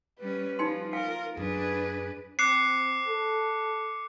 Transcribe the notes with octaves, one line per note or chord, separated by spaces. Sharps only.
G3 C#4 B4
F3 G3 D#4 G#5 C6
F4 A#4 F5 G#5
F#2 D4 G#4 B4
C4 D6 F#6 C7 C#7
A4